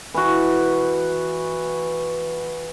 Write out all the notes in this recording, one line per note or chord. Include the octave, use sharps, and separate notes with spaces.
E3 F#4